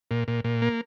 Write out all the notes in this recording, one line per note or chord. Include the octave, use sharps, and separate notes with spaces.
A#2
A#2
A#2
A#3